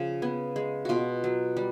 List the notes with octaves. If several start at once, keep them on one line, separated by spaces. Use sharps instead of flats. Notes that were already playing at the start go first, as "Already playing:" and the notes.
Already playing: C#3 F3
B3
G#3
B2 F4 F#4
F#3
G3